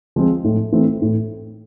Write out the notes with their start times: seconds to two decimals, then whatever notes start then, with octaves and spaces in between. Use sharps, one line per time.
0.16 F3 G#3 C4 F4
0.44 A2
0.72 E3 A3 C4
1.02 A2